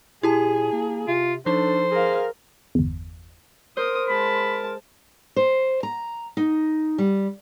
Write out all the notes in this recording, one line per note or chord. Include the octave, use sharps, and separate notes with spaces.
A#2 E4 G4 G#4 A5
A#3
C3 F4
F3 D4 D#4 A4 C5
G#4 A#4 F5
G1 E2
A#4 C5 D#6
G#3 A5 B5
C5
A#5
D#4
G3